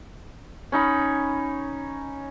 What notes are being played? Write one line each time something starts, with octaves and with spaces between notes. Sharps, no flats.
C#4 D#4 B5